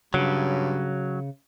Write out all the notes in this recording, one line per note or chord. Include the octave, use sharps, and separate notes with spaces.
G2 C#3 F#3